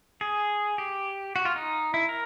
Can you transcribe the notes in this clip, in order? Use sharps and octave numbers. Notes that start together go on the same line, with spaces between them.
G#4
G4
F#4
F4
D#4
E4
A#4